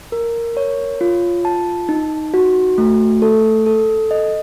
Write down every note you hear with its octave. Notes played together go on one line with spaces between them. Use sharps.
A#4
C#5
F4
A5
D#4
F#4
A3
A4
A4
D#5